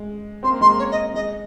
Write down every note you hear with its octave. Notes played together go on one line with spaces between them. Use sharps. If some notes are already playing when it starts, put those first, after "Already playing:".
Already playing: G#3
C4 C6
A#3
G#3 C6
A#3
C#5
D#5
G#3 D#5